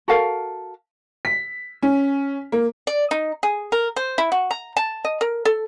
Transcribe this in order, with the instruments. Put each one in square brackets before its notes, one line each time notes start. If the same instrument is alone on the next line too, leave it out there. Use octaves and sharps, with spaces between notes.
[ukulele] F#4 A4 A#4 F5
[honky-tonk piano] B6
C#4
A#3
[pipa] D5
D#4
G#4
A#4
C5
E4
F#4
A#5
A5
D#5
A#4
A4